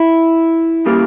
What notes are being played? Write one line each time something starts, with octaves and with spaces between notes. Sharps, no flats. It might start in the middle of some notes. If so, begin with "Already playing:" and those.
Already playing: E4
C#3 G3 A#3